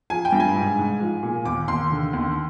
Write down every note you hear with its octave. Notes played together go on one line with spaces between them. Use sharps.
F3 G#5
G5
G2
G#5
G#2
G#2
F3
A#2
D#2 D6
D#2 C6
D3
D#2